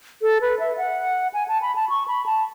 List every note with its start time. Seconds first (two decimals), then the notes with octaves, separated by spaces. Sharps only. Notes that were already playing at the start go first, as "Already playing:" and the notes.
0.22 A4
0.41 B4
0.60 E5
0.78 F#5
1.34 G#5
1.48 A5
1.62 B5
1.76 A5
1.90 C#6
2.08 B5
2.26 A5